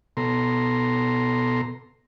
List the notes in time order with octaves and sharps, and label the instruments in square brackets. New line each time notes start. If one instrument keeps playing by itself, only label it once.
[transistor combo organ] B2 A4 A#5 C6